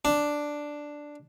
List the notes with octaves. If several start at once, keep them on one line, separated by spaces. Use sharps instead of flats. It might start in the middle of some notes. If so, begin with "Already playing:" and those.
D4